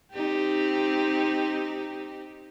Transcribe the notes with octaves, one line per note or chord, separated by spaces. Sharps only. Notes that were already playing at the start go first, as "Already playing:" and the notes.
C4 D#4 G4